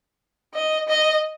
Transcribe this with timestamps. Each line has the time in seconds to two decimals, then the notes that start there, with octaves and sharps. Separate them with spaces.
0.54 D#5
0.88 D#5